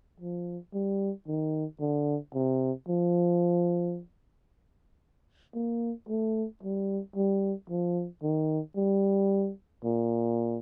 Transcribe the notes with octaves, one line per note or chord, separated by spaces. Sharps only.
F3
G3
D#3
D3
C3
F3
A#3
A3
G3
G3
F3
D#3
G3
A#2